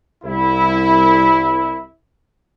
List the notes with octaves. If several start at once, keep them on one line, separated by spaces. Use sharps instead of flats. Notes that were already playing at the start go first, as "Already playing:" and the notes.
C2 E4